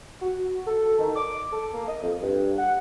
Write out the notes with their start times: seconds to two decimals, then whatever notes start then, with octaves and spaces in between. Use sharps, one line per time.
0.21 F#4
0.67 A4
0.99 D#3
1.16 D6
1.51 A4
1.73 A#3
1.88 D#5
2.03 F2
2.22 G2
2.58 F#5